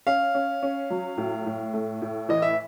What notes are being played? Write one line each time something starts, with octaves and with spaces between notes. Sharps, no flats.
C#4 F5
C#4
C#4
F#3
A2
A2
A3
A2
E3 D#5
E5